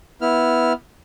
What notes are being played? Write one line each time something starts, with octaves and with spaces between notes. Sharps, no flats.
B3 E4 F6